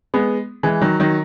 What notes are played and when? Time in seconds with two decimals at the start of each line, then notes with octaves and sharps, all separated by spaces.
0.14 G#3 B3
0.63 E3 G#3
0.82 D#3 F#3
1.00 D#3 F#3